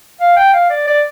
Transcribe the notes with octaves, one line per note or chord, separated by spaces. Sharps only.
F5
G5
F5
D5
D5